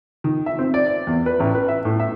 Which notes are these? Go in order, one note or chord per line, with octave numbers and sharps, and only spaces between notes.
D#3
E5
C4
D5
D5
E2
B4
A1
B4
E5
A2
E5